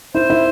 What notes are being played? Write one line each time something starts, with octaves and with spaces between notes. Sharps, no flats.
E4 C5
E4